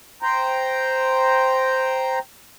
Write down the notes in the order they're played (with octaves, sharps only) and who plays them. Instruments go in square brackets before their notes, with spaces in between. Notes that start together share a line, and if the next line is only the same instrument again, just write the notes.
[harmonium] C5 G5 A#5